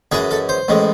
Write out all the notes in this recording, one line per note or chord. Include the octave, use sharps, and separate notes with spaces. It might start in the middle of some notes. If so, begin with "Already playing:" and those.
F#2 E3 G#3 G#4
A4
C5
A1 A2 G#3